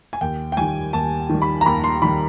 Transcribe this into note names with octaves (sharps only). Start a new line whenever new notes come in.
G#5
D#2 G5
G5
D#3 G3 G#5
D#2 A5
D#3 G3
B5
A#5
D#2 B5
C6
D#3 G3 B5